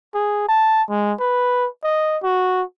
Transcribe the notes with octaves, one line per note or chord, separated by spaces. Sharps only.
G#4
A5
G#3
B4
D#5
F#4